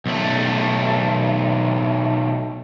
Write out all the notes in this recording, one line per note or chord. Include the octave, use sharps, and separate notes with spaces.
B1 A3